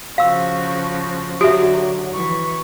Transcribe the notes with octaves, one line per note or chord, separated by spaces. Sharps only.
C#3 F3 F#4 F5 E6
D3 F#3 F#4 G4 E5
E3 C#6